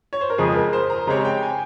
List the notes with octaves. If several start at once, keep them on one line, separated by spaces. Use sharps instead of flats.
C#5
C5
A#4
F2 C#3 F3 G#3 G#4
A#4
C5
A#5
C#3 G#3 C4 G4 C#5 A#5
G5
G#5